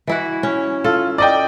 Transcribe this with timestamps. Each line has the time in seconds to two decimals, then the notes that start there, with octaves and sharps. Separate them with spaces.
0.07 E3 E4 F#4
0.43 C#4
0.84 F4 A4
1.18 D5 D#5 G5